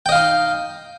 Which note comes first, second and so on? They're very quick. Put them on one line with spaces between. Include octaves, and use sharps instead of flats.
G5 D#5 F5 D#4